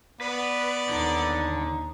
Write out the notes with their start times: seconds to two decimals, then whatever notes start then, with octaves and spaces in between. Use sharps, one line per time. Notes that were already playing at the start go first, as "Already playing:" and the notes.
0.21 B3 B4 D5
0.89 D#2 D3 D#4